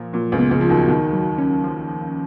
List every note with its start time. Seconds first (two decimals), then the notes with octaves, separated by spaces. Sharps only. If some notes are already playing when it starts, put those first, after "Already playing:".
Already playing: A#2 F3
0.13 A#2 F#3
0.32 C#2 C#3
0.38 B3
0.51 C#2 C#3
0.61 F3 F#4
0.69 D#2 D#3
0.88 D#2 D#3 F#4
1.13 F#3
1.38 C#4
1.64 F3
1.88 F3